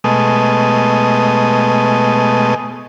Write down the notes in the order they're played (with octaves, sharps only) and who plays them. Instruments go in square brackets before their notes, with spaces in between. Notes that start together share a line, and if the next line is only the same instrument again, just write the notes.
[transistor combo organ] B2 G#3 A3 D#5